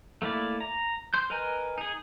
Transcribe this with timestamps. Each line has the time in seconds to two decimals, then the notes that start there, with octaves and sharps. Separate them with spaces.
0.22 A3 A#3 E4 D5
0.60 A#5
1.14 C6 G6
1.30 A#4 B4 D#5 G#5 A#5
1.78 D#4 G#4